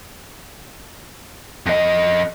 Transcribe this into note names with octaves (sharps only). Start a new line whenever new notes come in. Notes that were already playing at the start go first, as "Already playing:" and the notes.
F2 D#5